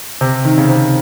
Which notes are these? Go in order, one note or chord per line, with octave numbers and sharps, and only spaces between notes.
C3
D#3
C#3
C3